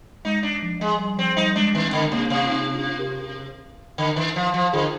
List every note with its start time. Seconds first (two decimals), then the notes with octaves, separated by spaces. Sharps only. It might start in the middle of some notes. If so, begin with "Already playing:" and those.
0.25 G#3 D#4
0.43 D4
0.62 F3
0.81 G#3
0.99 G3
1.17 F3 C4
1.37 G3 D#4
1.56 G#3 D4
1.74 D#3 C4
1.93 D3
2.11 C3 A#3 D4
2.30 C3
2.45 F4
2.49 C4 D#4
2.73 D4 F4
2.99 G4 A#4
3.98 D3
4.16 D#3
4.36 F3
4.54 F3
4.73 D3 F4 G#4